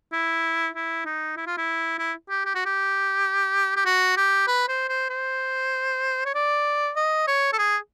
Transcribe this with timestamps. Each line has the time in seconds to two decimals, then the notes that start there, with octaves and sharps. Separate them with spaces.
0.13 E4
0.75 E4
1.06 D#4
1.37 E4
1.47 F4
1.58 E4
1.99 E4
2.30 G4
2.46 G4
2.55 F#4
2.66 G4
3.76 G4
3.86 F#4
4.17 G4
4.47 B4
4.68 C5
4.89 C5
5.10 C5
6.26 C#5
6.35 D5
6.96 D#5
7.28 C#5
7.53 A4
7.58 G#4